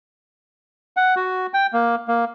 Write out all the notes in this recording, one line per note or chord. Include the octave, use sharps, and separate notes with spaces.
F#5
F#4
G5
A#3
A#3